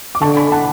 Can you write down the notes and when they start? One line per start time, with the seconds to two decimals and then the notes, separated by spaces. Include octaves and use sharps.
0.15 D6
0.21 D3 A5 C#6
0.36 G#5 B5
0.52 F#5 A5